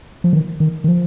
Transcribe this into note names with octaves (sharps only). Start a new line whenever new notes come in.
F3
D#3
D#3
D#3
F3